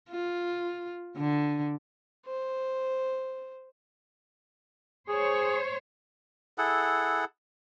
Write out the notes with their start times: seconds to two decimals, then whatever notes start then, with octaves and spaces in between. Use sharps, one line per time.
0.10 F4
1.17 D3
2.26 C5
5.08 G#4 C5 C#5
6.58 E4 G#4 A4 F#5